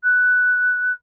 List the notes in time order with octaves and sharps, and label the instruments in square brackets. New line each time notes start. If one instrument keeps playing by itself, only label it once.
[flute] F#6